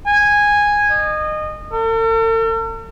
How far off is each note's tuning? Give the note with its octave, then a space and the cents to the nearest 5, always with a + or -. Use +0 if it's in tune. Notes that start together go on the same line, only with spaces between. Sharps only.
G#5 -10
D#5 -25
A4 +45